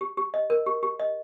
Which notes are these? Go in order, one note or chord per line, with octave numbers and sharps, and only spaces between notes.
G4
G4
D#5
A#4
G4
G4
D#5